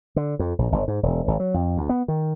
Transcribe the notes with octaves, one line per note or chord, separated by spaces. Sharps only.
D3
F2
A#1
G1
G#2
E1
G#1
F#3
F2
D2
B3
D#3